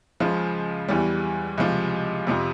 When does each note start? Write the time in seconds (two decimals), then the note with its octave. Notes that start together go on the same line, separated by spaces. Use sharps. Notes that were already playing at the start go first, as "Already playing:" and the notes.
0.20 C#2 C#3 F3
0.88 E2 E3 G3
1.58 C#2 C3 F3
2.27 F2 C3 F3